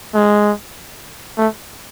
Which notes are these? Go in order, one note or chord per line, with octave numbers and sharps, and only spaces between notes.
G#3
A3